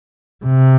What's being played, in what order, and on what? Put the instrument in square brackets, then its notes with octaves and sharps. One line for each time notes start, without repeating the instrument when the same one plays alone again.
[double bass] C3